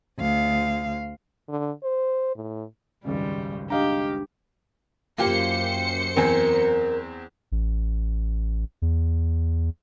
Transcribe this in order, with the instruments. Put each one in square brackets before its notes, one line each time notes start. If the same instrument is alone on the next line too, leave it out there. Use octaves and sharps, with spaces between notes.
[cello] D2 F5
[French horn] D3
C5
A2
[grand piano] G#1 C#2 F#2 [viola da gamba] G3 G#3
[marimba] D4 [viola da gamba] G4 [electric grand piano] D#5 F5 A#5
[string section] F#2 C5 C#7 [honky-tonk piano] A#3 F4 G4
[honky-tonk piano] E2 C4 G#5 [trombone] A#4
[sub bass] A1
E2